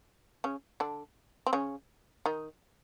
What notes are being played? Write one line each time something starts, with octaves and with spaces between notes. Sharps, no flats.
C#3 C#4
D3 D4
C4
C#3 C#4
D#3 D#4